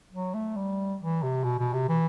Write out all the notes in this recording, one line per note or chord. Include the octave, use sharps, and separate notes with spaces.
F#3
A3
G3
E3
C3
B2
B2
C3
E3